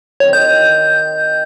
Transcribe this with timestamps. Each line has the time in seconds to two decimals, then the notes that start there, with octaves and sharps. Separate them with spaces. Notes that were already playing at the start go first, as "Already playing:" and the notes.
0.20 D#3 F#3 C4 C#5
0.33 D#5 G5 G6